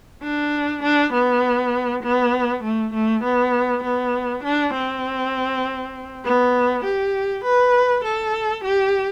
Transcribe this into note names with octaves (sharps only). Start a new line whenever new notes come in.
D4
D4
B3
B3
A3
A3
B3
B3
D4
C4
B3
G4
B4
A4
G4